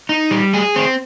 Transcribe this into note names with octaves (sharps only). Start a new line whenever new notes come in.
D#4
G3
G#4
C4